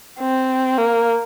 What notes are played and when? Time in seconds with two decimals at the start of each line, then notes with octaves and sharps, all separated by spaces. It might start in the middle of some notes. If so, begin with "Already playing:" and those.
0.20 C4
0.78 A#3